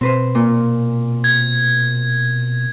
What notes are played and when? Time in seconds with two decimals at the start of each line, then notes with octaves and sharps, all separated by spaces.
0.01 B2 C4 B4 C5
0.35 A#2
1.24 G#6